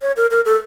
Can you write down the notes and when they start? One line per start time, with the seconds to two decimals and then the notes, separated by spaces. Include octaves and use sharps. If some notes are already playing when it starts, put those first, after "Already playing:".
0.02 C#5
0.17 A#4
0.31 A#4
0.45 A4